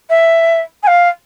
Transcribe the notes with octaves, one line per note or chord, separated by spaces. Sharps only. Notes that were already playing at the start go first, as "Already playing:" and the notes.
E5
G#5
F5